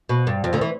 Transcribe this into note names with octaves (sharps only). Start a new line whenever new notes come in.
B2
G2
F2
D2 D3
E3